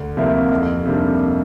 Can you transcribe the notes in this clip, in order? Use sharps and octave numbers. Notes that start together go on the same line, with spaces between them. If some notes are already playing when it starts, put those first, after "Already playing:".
Already playing: D2
C3 F3 A#3 E4
F2
C3 G3 A#3 D4